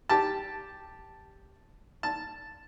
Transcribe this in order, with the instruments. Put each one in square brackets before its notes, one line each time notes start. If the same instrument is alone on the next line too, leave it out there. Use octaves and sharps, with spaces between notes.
[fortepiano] G4 A5
A5